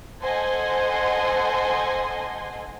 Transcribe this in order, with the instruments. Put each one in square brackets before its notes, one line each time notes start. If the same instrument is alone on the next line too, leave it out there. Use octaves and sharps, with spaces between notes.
[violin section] A4 C5 D#5 F#5 G#5 C6